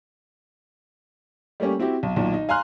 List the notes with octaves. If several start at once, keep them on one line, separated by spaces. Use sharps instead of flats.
G3 A3 A#3 C#4 G4
C4 E4 F#4 G4
B1
B1 A#2 D#3
D#4
F5 G#5 A#5 C6 F6 F#6